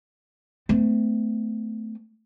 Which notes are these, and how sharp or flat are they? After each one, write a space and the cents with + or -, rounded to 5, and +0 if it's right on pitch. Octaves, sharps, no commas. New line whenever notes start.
A3 +0 C4 -45